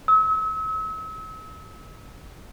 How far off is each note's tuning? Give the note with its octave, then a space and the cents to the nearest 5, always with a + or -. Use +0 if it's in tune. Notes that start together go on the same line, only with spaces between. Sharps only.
E6 -40